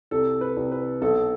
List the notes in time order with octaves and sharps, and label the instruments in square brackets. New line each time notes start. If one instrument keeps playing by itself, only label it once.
[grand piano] C2 A4
B4
C2
B4
B1 A4